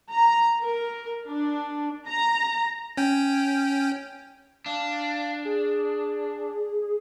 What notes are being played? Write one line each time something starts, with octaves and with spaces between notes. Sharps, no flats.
A#5
A#4
D4
A#5
C#4 G5
D4 F5
G#4